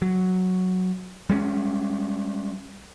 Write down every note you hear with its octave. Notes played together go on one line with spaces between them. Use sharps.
F#3
G3 G#3 B3 C#4